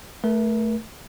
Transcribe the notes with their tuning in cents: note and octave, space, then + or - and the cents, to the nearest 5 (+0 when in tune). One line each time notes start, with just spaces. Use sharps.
A3 +0 A#4 +40